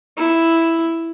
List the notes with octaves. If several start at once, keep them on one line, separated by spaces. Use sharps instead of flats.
E4